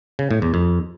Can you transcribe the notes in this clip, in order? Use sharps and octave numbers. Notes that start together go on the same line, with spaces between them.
C#3
A2
E2
F2